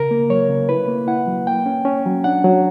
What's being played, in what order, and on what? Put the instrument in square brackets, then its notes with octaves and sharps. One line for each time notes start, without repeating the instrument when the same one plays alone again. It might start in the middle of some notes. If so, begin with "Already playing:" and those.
Already playing: [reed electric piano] C#3 A#4
A#3
F#3 C#5
C#3
E4 B4
A#3
E4 F#5
F#3
A#3 G5
C#4
C#4
F#3
D4 F#5
F#3